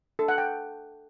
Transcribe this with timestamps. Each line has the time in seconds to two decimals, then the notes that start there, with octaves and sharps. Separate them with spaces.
0.19 A4
0.28 F#5
0.38 G5